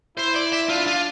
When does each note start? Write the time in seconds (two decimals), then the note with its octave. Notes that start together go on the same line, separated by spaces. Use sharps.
0.17 E4 C5
0.35 D5
0.52 E5
0.69 D4 F4
0.87 F4